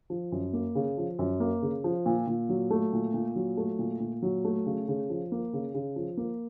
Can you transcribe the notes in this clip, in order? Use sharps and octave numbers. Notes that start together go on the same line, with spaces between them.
F3
F#2
A#3
C#3
F3
F#2
A#3
C#3
F3
A#2
A#2
F#3
A3
A#2
A#2
F#3
A3
A#2
A#2
F#3
A3
C#3
C#3
F3
A#3
C#3
C#3
F3
A#3